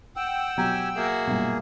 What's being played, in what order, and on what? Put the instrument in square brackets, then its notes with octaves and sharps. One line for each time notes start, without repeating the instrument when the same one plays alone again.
[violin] F#5 [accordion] G5 E6
[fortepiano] B2 F#3 A#5 [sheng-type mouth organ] G4 G#5
[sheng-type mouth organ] A#3 G#4 [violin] F#4 E5
[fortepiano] B1 G2 A#2